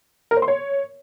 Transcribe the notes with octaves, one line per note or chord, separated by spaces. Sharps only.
A#4
C5
C6
C#5